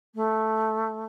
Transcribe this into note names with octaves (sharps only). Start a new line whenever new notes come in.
A3